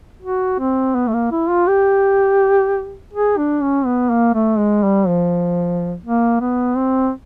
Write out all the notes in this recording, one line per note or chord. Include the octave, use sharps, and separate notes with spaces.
F#4
C4
B3
A3
A#3
E4
F4
G4
G#4
D4
C#4
B3
A#3
A3
G#3
G3
F3
A#3
B3
C4